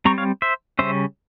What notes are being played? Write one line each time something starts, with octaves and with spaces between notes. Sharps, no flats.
G3 C4 A#5 C#6
C#5 F5
C5 E5
C#3 G3 C#4 C5 E5